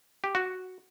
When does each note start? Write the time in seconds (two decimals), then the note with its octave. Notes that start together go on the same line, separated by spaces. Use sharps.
0.24 G4
0.35 F#4